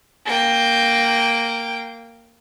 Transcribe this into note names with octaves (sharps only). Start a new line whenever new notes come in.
A#3 G5